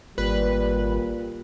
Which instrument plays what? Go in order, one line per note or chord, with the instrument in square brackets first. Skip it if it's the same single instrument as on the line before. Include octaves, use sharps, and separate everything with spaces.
[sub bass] G#1 [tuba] A#2 [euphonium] G3 [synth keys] B4